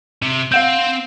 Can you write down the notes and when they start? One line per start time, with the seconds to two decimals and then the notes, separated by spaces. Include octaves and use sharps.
0.22 C3
0.52 C4 F5 F#5 G6